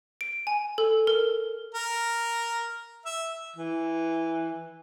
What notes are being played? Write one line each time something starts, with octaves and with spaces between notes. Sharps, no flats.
D7
G#5
A4
A#4
A#4
E5
E3